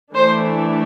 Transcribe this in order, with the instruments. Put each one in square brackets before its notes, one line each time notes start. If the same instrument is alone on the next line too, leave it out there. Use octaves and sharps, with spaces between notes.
[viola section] E3 A3 D4 C5